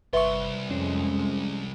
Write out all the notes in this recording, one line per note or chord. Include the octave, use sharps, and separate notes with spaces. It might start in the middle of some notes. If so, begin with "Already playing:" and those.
G1 C2 B4 E5 C6 C#6
F2 G#3 C#4